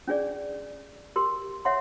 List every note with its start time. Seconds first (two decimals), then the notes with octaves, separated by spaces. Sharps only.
0.07 C#4 D4 G#4 D5
1.16 G4 A#4 C6
1.65 C#5 E5 F#5 C6